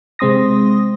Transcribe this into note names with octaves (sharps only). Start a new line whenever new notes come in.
C3 G#3 C4 C6 D#6 A#6